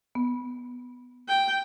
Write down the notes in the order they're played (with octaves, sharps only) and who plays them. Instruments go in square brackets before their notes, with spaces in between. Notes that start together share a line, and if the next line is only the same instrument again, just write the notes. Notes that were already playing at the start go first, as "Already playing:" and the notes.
[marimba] B3
[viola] G5